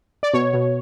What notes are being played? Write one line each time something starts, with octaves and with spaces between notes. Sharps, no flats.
D5
B2 C#5
B2